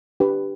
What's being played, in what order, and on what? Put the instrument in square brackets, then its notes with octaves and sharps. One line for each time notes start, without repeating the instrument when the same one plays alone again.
[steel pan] D4 G4 B4